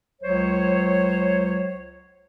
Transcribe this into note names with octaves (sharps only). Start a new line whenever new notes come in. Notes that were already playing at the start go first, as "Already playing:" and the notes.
C#2 F#3 C5 C#5